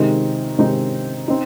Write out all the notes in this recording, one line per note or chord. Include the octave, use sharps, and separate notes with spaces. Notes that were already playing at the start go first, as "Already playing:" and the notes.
Already playing: C3 D#3 G#3 C4 D#4
C3 D#3 G#3 C4 D#4
C4 D#4